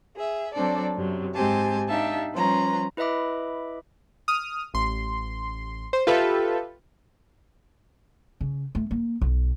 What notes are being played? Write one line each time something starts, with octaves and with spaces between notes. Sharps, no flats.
G#4 E5
F#3 C4 D4 A4 D5
F#2 C3 F#3
G#2 G#3 C4 G4 G#5 A5
D4 D#4 G4 E5 F5 A5
F3 G3 C#4 B4 A#5 C6
E4 B4 D#5 E5 B5 D6
D#6 F6
A1 C6
C5
F4 G4 A4 B4 E5
C#3
A3
A#3
B1